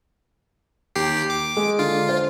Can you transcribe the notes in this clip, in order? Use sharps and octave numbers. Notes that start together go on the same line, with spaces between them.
D#2 G4 C7
D6
G#3
D3 F4
C5